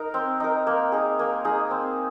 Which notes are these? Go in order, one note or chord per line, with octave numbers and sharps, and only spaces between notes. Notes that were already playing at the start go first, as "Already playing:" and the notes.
Already playing: D#4 A#4
C4
D#4 A#4
A#3
D#4 G#4
A#3
D#4 G#4
C4